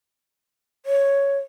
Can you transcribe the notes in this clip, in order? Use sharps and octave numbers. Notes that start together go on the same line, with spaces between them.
C#5